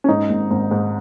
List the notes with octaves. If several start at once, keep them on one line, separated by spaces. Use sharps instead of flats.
C#4
G#2 D#4
G#1
G#1
G#2